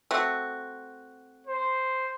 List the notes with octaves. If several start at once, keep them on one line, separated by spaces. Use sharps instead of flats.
A3 C4 F#4
C5